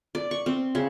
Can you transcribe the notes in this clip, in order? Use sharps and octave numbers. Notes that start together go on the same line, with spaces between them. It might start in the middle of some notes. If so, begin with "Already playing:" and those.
D5
C#6
C4
C#3